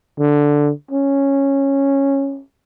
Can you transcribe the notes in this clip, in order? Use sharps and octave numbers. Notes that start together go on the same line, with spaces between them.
D3
C#4